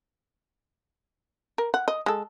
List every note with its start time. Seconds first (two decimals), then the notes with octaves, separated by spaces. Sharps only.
1.58 A#4
1.74 F#5
1.88 D#5
2.06 G#3 A4